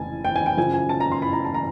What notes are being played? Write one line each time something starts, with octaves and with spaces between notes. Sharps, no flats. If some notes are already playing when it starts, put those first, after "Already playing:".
Already playing: F1 C#3 E3 G#5 A5
G5
G#5
G5
F#2 C#3 F3 G#5
G#5
A5
A#5
C6
B5
A#5
A5
A#5